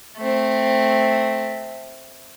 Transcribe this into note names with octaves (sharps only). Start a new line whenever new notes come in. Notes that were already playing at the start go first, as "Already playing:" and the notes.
A3 C4